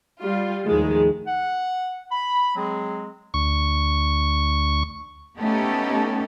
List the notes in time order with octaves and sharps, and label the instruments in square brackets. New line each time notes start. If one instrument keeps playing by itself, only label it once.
[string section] G3 F4
D#2 A2 D#3 F3 G#3
[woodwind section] F#5
B5
F#3 G#3 C4 G#4
[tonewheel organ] D2 C#6
[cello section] A3 B3 C#4 D#4 G4 A4